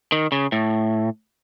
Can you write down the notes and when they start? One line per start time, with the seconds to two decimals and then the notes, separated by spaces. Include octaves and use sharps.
0.12 D#3
0.32 C#3
0.52 A2